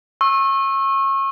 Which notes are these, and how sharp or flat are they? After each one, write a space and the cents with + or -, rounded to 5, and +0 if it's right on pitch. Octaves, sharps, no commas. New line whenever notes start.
C#6 -30 E6 +0